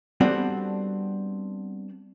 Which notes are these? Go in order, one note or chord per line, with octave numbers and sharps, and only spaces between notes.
G3 B3 C4 D4 F#4 A4